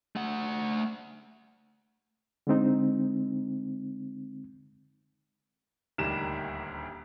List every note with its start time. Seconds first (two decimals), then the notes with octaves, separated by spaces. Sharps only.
0.16 A3 F#5
2.47 D3 G#3 C4 D#4
5.98 D#1 D2 D#3 G3 A#5 E7